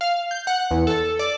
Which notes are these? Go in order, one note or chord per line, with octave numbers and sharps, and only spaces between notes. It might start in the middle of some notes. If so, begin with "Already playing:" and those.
F5
G6
F#5
E2
A4
D5